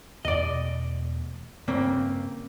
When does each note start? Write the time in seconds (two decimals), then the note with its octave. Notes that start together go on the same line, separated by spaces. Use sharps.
0.25 E2 B2 A3 D5 D#5
1.68 G2 C#3 A#3 C4